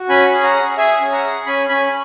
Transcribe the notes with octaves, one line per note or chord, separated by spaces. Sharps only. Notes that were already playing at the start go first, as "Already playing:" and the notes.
Already playing: F#4
C#4 G#5 B5
G#4
F#5 A#5
G#4
G#4 E5 G#5
C#4
F#5 A#5
G#4
C#4 G#5 B5
C#4 G#5 B5
G#5